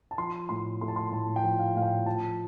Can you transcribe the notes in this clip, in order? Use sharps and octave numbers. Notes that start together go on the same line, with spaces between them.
A5
F3 C6
A2 C6
A3 C6
A5
C6
A2 A5
G5
F3
F5
A2 F5
G5
F3 A5